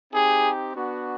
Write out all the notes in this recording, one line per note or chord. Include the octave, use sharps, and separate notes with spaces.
C4 D#4 G4 G#4
B3 D4 F#4